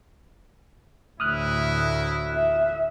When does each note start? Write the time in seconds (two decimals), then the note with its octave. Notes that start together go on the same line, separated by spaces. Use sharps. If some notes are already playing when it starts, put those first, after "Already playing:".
1.20 D2 A2 E4 D#6 F6 F#6
2.32 E5